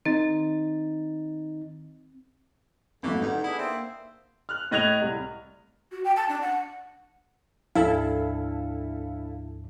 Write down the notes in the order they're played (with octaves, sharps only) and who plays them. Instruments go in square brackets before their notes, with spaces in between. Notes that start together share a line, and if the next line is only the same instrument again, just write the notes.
[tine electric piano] D#3 D#4 A6 [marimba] C4
[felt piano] G#1 F#2 [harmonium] D3 [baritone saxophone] E3 [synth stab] A3 A#3
[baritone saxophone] G2 [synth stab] D#4 [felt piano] F#5
[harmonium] B3 D4 G#4 [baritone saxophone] E4
[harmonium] A#3 E5 [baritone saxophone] C4
[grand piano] F6 F#6
A2 D#5 F#6 G#6 F7
C2
[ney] F#4
G5
A5
D4
F#5
[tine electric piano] D2 G#2 F3 [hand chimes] D4 [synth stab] E4 A4 [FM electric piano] F5